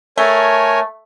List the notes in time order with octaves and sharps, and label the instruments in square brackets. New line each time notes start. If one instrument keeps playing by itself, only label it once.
[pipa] A3 [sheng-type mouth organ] A#4 C#5 G#5